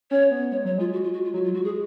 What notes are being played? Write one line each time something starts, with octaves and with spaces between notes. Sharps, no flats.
C#4 C#5
B3
G#3 C#5
F#3 C#5
G#3 F4
F#4
F4
F#4
F4
F#3 F#4
F4
G#3 F#4
G#4